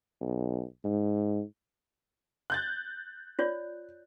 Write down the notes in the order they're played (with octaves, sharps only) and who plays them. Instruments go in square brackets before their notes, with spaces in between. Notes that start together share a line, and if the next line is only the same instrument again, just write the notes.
[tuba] B1
G#2
[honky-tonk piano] F#6 G6 A6
[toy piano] F4 C#5 D5